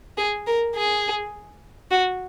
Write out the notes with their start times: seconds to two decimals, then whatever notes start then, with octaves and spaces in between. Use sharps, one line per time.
0.18 G#4
0.47 A#4
0.76 G#4
1.91 F#4